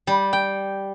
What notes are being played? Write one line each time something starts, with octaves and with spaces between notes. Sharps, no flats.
G3
G5